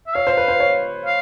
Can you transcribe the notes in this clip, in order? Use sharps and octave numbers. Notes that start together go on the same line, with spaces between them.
E5
C#5 F5
C5
B4
C5
C#5
F5